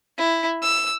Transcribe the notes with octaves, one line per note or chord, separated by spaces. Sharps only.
E4
E6